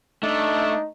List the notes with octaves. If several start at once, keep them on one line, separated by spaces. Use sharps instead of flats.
A3 D4 D#4